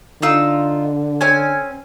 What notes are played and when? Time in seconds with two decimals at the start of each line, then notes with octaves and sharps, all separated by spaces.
0.22 D3 D#4 F4 E6
1.21 C4 C#4 G#5